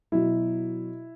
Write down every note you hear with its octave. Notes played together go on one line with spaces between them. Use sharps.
B2 F#3 E4